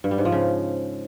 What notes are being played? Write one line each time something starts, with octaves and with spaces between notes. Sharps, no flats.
G2
G3
G#2
F3
C#3